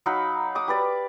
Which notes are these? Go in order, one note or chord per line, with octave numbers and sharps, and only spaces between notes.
F#3 D#4 F5 B5
D6 D#6
G4 B4 D5